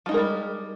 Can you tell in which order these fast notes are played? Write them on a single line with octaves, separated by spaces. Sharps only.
F3 D#4 G#3 A#4 G3